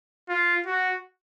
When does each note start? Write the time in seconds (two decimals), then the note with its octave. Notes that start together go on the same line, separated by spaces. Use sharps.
0.29 F4
0.66 F#4